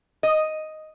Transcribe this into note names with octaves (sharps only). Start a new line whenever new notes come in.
D#5